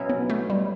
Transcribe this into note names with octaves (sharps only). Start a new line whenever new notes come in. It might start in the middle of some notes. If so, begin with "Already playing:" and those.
Already playing: B2 F#3 C#4 E4
B3
A3
G3